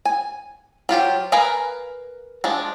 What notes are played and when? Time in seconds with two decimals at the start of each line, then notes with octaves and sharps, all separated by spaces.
0.05 G#5
0.89 F#3 F4 G4 C5
1.32 A#4 B4 F5 G#5 A#5
2.44 F3 G#3 D4